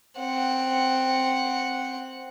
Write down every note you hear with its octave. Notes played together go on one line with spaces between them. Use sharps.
C4 F#5